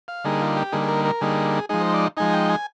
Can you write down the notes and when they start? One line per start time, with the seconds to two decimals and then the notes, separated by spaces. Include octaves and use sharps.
0.08 F5
0.24 D3 G3 A#3 D#4 G#4
0.41 F4
0.56 G4
0.72 D3 G3 A#3 D#4 G#4
0.83 G#4
0.88 A#4
1.05 A#4
1.21 D3 G3 A#3 D#4 G#4
1.69 F3 G#3 D#4 G#4
1.81 C5
1.94 D5
2.17 F3 G#3 D#4 G#5
2.33 G5
2.50 G#5